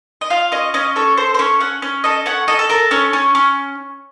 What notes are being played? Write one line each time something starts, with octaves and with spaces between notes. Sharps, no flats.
D#5
F4 F5
C#4 D#5
C#4 D#5
A4 C#5
A4 C5
C5
C#4 C#5
C#4 F#5
C#4
A4 D#5
C#4 F#5
A4 D#5
A4
A4 A#4
C#4 C#5
C#4
C#4